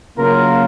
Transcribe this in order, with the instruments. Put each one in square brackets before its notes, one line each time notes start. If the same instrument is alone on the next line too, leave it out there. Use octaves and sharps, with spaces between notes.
[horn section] C#3 F#3 A#3 F4 A#4